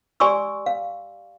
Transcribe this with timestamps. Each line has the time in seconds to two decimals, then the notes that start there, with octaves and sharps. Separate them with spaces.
0.20 G4 D5 G#5 C6 C#6 E6
0.66 F5